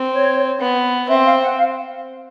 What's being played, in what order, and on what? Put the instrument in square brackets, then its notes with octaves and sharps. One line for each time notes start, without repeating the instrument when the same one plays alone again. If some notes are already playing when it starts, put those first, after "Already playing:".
Already playing: [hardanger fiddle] C4
[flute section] C#5
[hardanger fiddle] B3
[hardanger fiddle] C4 [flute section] E5
[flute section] F5
F#5
F5